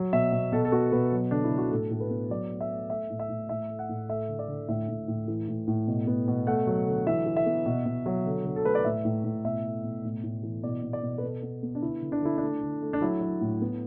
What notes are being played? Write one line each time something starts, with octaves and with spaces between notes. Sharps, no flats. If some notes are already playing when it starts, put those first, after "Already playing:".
Already playing: F#3
B2 E5
B2
B2 A4
A4
B3 F#4
B2 B4
F#3
D3 D4
E4
D3
F#4
A2 A4
A2 A4
B4
B3
F#3 D5
A3
E5
A3
A3 E5
A2
E5
A2
A2 E5
A3
F#5
A2
A3 E5
D3
D5
D3
A2 E5
A2
A2
E3
A2
A2
B2
B3
B2
A3 F#5
F#3
D3
E3 E5
E3
E5
B3
B2
B2
F#3
D3
D3
A4
A3 B4
D5
A2 E5
A2
A2
B2 E5
A3
B2
A2
A2
E3
B2 D5
B2
D5
B2
B4
B3 A4
B3
B3
D4
D3 E4
D3
D4
D3 E4
A3 D4
D3
A3
D4
F#3 E4
F#3
A2
B3